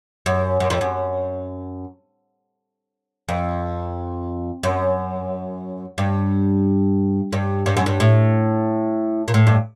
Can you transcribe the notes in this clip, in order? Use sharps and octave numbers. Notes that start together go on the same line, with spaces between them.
F#2
F#2
F2
F#2
F2
F#2
G2
G2
G2
F#2
G2
A2
A#2
A2
G2